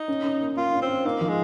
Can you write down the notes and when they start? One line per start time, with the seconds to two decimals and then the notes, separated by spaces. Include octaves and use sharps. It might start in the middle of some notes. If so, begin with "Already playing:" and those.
Already playing: D#4
0.08 C#4
0.24 C#4
0.41 A#3
0.56 A#3 F4
0.73 C#4
0.81 C4
0.89 F4
1.05 A#3 D#4
1.21 F3
1.29 G#3